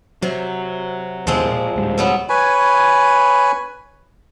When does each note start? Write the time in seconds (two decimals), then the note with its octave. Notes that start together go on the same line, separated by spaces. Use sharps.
0.22 C3 F#3
1.27 D#2 B2 D3 F3 G#3 C4
1.45 A#2 A#3
1.76 D1 G#2 G3
1.98 B2 F#3 B3
2.29 B4 C#5 G#5 B5